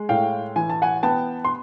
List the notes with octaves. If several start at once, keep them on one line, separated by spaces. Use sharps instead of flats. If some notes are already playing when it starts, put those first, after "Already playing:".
Already playing: G#3
A2 F5 G5
E3 G#5
A5
F#5 G#5
B3 G5 A5
C6